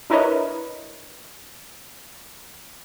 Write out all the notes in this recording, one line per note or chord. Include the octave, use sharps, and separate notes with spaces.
D4 E4 A#4 B4 C#5 D#5